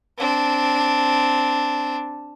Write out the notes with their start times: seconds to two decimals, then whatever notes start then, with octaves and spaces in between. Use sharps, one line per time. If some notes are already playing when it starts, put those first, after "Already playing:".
0.18 C4 D4